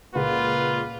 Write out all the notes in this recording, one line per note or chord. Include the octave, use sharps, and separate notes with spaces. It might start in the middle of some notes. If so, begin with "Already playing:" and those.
C#2 A#2 A#3 F4 B4 F#5